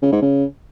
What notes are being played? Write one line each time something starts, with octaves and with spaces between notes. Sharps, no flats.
C#3
G#2
C#3